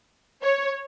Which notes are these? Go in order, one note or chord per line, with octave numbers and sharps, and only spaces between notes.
C#5